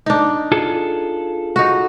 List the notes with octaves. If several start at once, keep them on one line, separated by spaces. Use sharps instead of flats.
D4 D#4
F4 G#4 A4
D#4 F#4